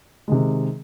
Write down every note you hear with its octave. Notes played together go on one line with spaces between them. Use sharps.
C3 D#3 G#3